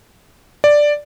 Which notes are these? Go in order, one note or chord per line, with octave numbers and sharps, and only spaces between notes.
D5